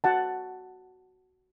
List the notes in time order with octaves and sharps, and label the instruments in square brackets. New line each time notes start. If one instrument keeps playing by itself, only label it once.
[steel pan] F#4 F#5 A5